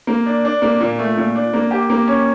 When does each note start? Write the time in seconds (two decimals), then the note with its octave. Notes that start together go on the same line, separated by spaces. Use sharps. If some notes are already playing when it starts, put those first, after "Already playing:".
0.07 A#3
0.26 D4
0.45 D4
0.62 A#3
0.81 A#2
0.99 A3
1.17 A#2
1.35 D4
1.53 A#3
1.71 G4
1.90 A#3
2.08 C#4